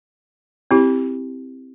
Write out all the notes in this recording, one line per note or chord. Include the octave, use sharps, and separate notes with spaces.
C4 E4 G4